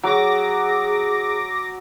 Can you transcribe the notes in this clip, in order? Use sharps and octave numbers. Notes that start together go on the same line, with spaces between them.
F#3 G#4 D6 A#6